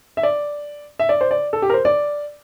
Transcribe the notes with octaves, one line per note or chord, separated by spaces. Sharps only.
E5
D5
E5
D5
C5
D5
A4
G4
A#4
C5
D5